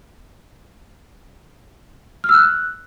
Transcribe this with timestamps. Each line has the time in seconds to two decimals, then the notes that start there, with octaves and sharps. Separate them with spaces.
2.24 F6
2.29 E6
2.34 F#6